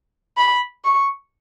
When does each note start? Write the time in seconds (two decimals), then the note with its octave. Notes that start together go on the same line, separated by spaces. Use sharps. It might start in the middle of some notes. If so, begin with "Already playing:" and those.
0.38 B5
0.84 C#6